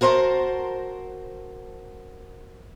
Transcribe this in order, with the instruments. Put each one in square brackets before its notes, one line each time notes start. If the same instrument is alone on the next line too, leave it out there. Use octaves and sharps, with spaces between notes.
[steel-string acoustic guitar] F#4 A#4 C5 F5 A5